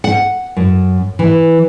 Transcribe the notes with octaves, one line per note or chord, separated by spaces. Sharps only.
F#5
F#2
E3